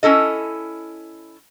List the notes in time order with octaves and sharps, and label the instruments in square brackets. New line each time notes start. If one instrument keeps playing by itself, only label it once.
[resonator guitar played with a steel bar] C#4 E4 A4 D#5